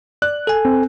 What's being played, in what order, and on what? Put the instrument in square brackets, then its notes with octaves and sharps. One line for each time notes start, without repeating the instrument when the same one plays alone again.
[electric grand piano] D5 F#6
[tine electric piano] A4 G#5
[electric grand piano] C4